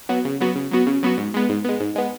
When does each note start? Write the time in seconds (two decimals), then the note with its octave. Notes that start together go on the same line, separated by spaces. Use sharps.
0.09 F#3 B3 F#4
0.25 C#3
0.41 F#3 B3 F#4
0.56 C#3
0.71 F#3 B3 F#4
0.87 C#3
1.03 F#3 B3 F#4
1.18 G#2
1.34 G#3 B3
1.49 G#2
1.65 G#3 B3
1.80 G#2
1.96 G#3 B3